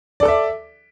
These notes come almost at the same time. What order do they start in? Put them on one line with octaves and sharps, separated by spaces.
D5 A4 D6 E5